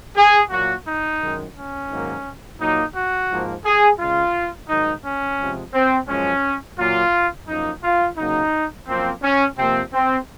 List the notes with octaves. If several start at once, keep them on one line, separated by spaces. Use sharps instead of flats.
G#4
A#2 F#3 A#3 F#4
D#4
F#2 D#3 G#3
C#4
G#2 D#3 F#3 A#3
A#2 F#3 A#3 D#4
F#4
G#2 F3 A#3
G#4
C#3 G#3 F4
G#2 D#3 F#3 D#4
C#4
C3 F3 G#3
C4
F#2 F3 G#3 C#4
A#2 F#3 A#3 F4
F#2 F3 A#3 D#4
F4
C#3 F#3 A#3 D#4
F#2 F3 A#3 C4
C#4
C3 F3 A#3 C4
C4